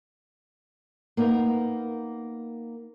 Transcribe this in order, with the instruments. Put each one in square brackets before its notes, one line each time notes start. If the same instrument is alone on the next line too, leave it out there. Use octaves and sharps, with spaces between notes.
[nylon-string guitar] A#3 B3 D#4 A#4